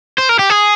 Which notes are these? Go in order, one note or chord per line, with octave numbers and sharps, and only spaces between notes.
C5
A#4
G4
G#4